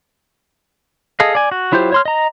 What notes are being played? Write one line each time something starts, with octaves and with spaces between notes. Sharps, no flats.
G#4 A4 D#5 F5
D5 G#5
F#4
F#3 E4 F4 G4 C5
C#5 C6 F6
D#5 A#5